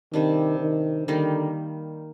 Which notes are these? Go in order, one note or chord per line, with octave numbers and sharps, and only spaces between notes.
C3 D#3 G3 D4
D#3
D3 D#3 G3 A#3